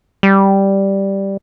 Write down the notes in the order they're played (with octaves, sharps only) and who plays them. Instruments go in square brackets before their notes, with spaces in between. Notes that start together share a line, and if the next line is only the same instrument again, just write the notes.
[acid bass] G3